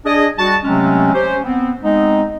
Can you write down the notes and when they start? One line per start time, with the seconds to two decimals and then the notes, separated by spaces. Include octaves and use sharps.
0.06 D4 G#4 D5 D#5
0.38 G3 F#4 A5
0.64 C3 F#3 G#3 A3 C4 C#4
1.13 C#4 G4 C5
1.43 B3 C4
1.82 G#3 B3 C4 D#4